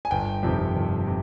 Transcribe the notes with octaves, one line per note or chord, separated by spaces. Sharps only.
G#5
G1 G5
F2 C3 D#3
G1
C3